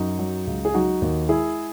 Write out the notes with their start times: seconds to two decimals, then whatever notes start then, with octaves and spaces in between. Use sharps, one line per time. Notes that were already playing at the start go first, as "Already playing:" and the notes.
Already playing: F#2 D#4 F#4
0.19 F#3
0.47 C#2
0.65 G#4
0.74 F#3 D#4 F#4
1.02 D#2
1.29 G#3 E4 G#4